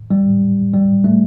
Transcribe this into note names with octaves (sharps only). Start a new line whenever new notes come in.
G3
G3
A3